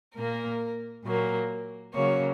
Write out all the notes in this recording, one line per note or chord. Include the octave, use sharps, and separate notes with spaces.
A#2 A#3 A#4
A#2 F#3 A#3
C#3 F#3 A#3 C#5